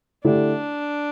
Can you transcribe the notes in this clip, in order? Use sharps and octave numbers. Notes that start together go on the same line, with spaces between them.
D3 A3 D4 E4 G4